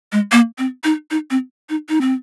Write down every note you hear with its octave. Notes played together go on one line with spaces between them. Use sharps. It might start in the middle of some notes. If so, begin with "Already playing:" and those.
G#3
A#3
C4
D#4
D#4
C4
D#4
D#4
C4